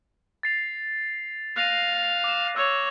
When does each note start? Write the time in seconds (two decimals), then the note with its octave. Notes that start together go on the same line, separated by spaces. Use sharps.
0.43 A6 C7 F7
1.56 F5 F#6 A#6 D#7
2.24 D6 E7
2.56 C#5 E6